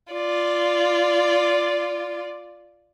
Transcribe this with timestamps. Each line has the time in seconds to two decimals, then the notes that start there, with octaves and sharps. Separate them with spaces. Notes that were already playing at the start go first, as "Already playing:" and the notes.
0.13 F4 D5